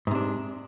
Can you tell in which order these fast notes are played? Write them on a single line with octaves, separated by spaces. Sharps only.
G#2 C3 D4